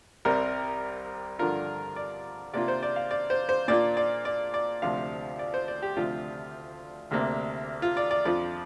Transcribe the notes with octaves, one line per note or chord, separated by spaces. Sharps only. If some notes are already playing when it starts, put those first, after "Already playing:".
C2 C3 G3 A#4
G2 D3 F3 D4 F4 A#4
D5
C3 A#3 D4 F4 D5
C5
D5
F5
D5
C5
C5
A#2 A#3 D4 F4 D5
D5
D5
D5
D2 C3 F3 D4 F4 F5
D5
C5
D5
G4
D2 C3 F3 D4 F4
D2 C3 A#3 D4
F4
D5
D5
F2 F3 D4 F4 D5